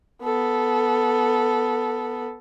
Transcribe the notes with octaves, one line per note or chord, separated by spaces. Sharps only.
B3 A4